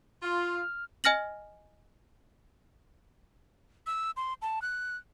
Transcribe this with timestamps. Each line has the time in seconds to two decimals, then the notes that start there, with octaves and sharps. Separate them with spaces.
0.22 F4 F6
1.04 D#5 G#5 F6 A#6 F#7
3.87 E6
4.17 C6
4.42 A5
4.62 F#6